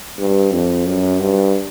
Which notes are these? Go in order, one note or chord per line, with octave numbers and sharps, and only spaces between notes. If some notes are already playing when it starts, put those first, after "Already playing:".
G2
F2
F#2
G2